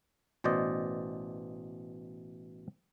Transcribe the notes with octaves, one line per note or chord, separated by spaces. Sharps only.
A1 B2 C5 D5 D#5